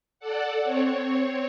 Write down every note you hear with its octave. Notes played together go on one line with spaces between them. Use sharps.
A4 D5 F#5
C4 C#5